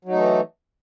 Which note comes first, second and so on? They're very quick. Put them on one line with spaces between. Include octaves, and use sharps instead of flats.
F#3 D#4 A3 E3